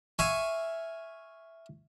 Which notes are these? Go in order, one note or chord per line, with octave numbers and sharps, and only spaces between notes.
E5 F5 G#5 C#6